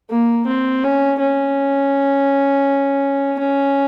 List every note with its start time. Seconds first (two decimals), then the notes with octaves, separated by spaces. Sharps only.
0.10 A#3
0.46 C4
0.84 C#4
1.19 C#4
3.39 C#4